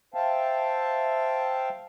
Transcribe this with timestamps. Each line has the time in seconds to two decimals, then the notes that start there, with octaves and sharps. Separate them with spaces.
0.14 C5 E5 F5 G5 A5